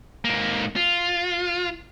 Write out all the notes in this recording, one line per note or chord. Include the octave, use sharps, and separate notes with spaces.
G#2 A#3
F4